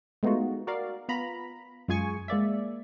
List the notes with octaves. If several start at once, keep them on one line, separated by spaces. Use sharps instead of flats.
G#3 A3 B3 D#4 F4 F#4
F#4 A#4 D5 F5
B3 F4 A#5 B5
F#2 G#3 F4 G#4 G#5 C#6
G#3 A#3 D5 E5